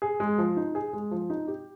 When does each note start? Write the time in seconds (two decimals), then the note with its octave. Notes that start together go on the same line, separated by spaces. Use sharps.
0.02 G#4
0.20 G#3
0.38 F3
0.57 D#4
0.75 G#4
0.93 G#3
1.11 F3
1.30 D#4
1.48 G4